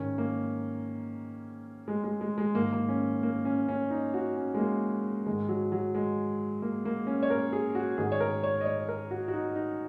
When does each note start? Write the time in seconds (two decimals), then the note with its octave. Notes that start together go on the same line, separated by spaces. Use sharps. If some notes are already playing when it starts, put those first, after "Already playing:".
Already playing: G#2 D#3 C#4
0.18 A#3
1.88 G#3
2.04 G#3
2.21 G#3
2.38 G#3
2.55 G#2 D#3 A#3
2.73 A#3
2.89 C#4
3.23 A#3
3.45 C#4
3.68 C#4
3.91 D#4
4.14 F#4
4.36 C#4
4.54 G#3
4.59 A#3
5.26 G#2 D#3 G#3
5.49 F#3
5.72 F#3
5.95 G#3
6.62 A#3
6.85 A#3
7.07 C#4
7.23 C#5
7.30 A#4
7.53 G#4
7.75 F#4
7.98 G#2 D#3 G#4
8.12 C#5
8.20 A#4
8.43 C#5
8.61 D#5
8.65 C#5
8.89 A#4
9.11 F#4
9.28 F#4
9.33 D#4
9.56 D#4